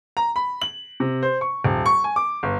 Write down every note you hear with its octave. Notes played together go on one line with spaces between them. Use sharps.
A#5
B5
F#7
C3
C5
C#6
D#1
C#6
G#5
D6
G1